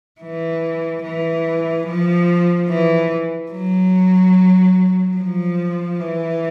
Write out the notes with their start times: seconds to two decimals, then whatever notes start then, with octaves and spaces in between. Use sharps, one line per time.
0.21 E3
1.04 E3
1.87 F3
2.69 E3
3.51 F#3
5.17 F3
6.00 E3